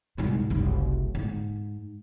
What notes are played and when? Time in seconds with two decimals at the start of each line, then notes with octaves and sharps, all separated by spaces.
0.18 C2 G#2
0.50 F#1 C2
1.15 G#2